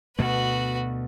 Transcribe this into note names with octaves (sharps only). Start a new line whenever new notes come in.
D2 B2 A3 F#4 B4